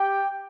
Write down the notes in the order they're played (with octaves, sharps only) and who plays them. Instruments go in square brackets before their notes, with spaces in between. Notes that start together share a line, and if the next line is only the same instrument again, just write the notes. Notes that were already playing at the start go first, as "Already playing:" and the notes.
Already playing: [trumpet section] G4 G5